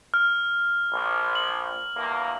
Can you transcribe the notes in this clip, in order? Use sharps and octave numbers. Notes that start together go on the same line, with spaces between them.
F6
A#1
F#7
E2 G2 A#3